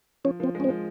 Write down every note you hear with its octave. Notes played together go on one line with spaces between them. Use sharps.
F3 C#4
F3 C4
G#3
C#4
C4
F3